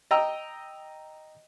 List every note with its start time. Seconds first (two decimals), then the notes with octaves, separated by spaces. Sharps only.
0.11 D#5 G5 A#5 E6